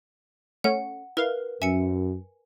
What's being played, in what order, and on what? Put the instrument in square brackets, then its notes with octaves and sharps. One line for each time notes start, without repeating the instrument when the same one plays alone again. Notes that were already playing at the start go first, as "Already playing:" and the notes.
[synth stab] A3 C#4 [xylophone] F#5
[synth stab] E4 F5 [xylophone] A#4 B4
[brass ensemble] F#2 [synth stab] E5 [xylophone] G#5 C#7